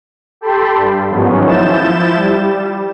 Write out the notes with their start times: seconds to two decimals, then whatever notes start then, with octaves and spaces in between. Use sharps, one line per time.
0.41 G4 A4 G5 A5 B5 C6
0.76 G2 G3
1.10 G#2 D#3 F3 F#3 B3 C#4
1.46 F3 E4 G6 A6 E7
2.15 G3